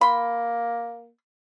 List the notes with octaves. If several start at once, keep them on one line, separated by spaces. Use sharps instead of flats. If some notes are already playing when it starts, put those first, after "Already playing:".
A#3 B5 C6